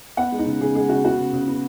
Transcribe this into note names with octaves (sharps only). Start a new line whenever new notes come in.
B3 F#5
G#3
D#4
C#3
C#3 G#4
G#3 G#4
C#3 F#4
B3 F#4
C#3
C#3
B3